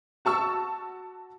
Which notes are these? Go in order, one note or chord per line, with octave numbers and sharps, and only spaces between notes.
F#4 A5 C#6 E6